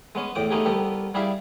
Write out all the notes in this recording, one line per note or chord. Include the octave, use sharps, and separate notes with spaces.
G#3 B3 C#4
E2 A2 G5 D6 D#6
A3 B3 C#4 D#4 G4 G#4
C2 B3 G4 A4 A#4
G3 E4 G4 G#4 E5 F5